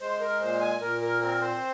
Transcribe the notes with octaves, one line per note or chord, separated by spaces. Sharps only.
G#3 C5
A#4
A#2 C5
G#5
A#2 A#4
A#4
C4 A#4
C5